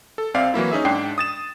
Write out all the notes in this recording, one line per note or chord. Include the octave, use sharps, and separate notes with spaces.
A4
C2 C4 D5 E5 F5
E3 F#3 A#3 E4
C#4 D#4 G#4 E5
G#2 D4 G5 C7
D#6 A6 E7